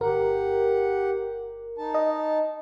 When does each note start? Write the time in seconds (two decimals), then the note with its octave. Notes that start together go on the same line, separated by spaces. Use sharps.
0.01 G1 G4 A#4 F#5
1.78 D#4 A5
1.94 D#5